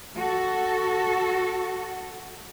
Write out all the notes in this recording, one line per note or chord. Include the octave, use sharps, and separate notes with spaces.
F#4 A4